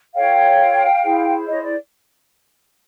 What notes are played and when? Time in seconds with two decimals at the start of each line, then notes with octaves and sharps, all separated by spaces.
0.15 F4 A4 C#5 F5 G5
1.03 E4 G#4 C5
1.47 C#5 D#5
1.62 D5